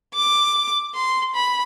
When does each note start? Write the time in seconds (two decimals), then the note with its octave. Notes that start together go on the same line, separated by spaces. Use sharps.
0.15 D6
0.95 C6
1.35 B5